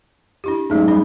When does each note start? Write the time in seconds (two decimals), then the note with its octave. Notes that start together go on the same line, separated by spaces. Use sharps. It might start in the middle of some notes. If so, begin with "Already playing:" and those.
0.44 D4 E4 G4
0.70 G#2 F#3 A3 C#4
0.88 G3 D4 B5